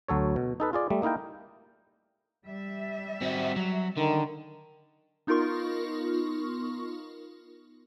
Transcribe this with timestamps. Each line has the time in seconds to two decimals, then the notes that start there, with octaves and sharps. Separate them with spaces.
0.08 D2 F#3 A4 C#5
0.36 B2
0.60 D#4 A4 B4
0.73 F4 G#4 D5
0.90 G3 A3
1.02 A#3 D#4 E4 A#4 G5
2.46 G3 E5
3.21 C4 F#4
3.56 F#3
3.97 D3 D#3
5.27 B3 D#4 F4 A#4 C6 C#6